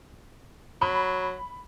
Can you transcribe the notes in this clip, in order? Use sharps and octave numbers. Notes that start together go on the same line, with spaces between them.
F#3 B5